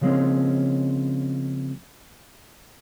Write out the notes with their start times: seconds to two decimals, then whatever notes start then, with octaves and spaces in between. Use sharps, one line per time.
0.01 C#3 F3 G#3 A#3 C4 C#4